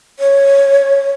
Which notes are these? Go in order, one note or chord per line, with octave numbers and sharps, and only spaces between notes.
C#5